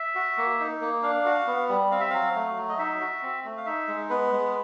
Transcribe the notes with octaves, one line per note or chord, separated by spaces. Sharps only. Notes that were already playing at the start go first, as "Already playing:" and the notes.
Already playing: E5
F#4
A#3
D#4
A#3
D4 F5
F#4
B3
G3
C4 F5
E5
F#3 F5
A3
F#3
D#5
D#4 E5
F#4
C4
A3
F5
D#4 E5
G#3
B3 B4
G#3